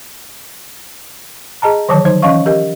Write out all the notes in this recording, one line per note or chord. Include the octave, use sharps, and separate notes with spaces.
G#4 D#5 A5 A#5
D3 D#3 F3 F#3 C#5 A5
F#3 D#4 C5
E3 C#4 D#5 F5 C#6
G4 A#4 D#5